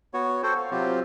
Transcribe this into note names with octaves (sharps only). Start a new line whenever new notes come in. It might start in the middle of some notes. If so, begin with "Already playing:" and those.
B3 F#4 C#5
F#4 A4 C5 C#5 G5
F5
C3 F#3 C4 F4 G4